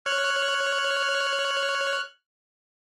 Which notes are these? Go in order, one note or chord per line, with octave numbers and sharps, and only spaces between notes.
C#5 F6 F#6